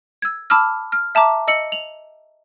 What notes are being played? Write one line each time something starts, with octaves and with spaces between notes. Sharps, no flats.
E6 G#6
A5 B5 D6 E6 F6
F6
E5 A5 A#5 D6
D#5 E6 C#7 F#7
F7 F#7